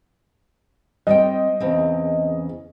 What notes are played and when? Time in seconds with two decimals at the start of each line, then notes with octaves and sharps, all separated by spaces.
1.07 G3 C4 D#5 G5
1.60 E2 C#3 C4